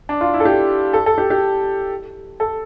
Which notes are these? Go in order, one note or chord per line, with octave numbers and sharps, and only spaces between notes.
D4
F4
E4
A4
G4
A4
A4
G4
G4
A4